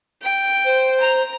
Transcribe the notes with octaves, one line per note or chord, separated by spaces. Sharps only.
G5
C5
A#5